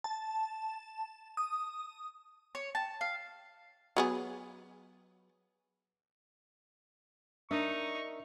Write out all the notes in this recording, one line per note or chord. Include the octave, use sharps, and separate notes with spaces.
A5
D#6
C#5
A5
F5
F#3 B3 G#4
D4 D#4 A#4 D#5 E5 C#6